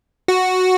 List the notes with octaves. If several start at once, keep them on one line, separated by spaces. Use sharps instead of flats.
F#4